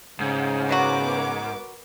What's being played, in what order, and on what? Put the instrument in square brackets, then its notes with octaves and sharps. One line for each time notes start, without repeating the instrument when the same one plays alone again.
[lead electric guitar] G#2 [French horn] C#3
[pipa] B2 F#3 F#4 [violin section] B3 A#4 D6